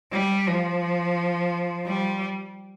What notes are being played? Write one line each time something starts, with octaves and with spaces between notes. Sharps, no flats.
G3
F3
G3